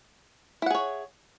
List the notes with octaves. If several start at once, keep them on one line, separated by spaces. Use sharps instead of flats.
E4 G#4 C#5 F#5